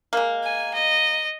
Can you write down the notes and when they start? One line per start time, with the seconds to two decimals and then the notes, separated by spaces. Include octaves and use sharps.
0.13 G#3 A#3
0.43 G#5
0.74 D#5